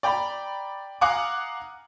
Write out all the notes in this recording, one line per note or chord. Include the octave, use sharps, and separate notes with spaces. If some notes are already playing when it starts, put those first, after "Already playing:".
D5 G5 A#5 B5
F5 F#5 G#5 A#5 D6 D#6